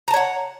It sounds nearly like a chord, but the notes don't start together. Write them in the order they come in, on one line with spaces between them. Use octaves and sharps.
A#5 A5 C#5 F#5